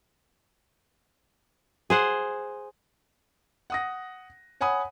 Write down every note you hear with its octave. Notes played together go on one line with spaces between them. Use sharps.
G#4 C5 F#5
F#5 D#6 A#6
C#5 F#5 G#5 B5 D#6